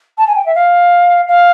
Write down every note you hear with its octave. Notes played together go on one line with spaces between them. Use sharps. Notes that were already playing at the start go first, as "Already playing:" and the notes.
A5
G#5
G5
E5
F5
F5